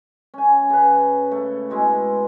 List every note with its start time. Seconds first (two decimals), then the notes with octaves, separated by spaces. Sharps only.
0.34 C#4 G#5
0.70 C#3 B4
1.31 A3
1.70 B2 G#3 E4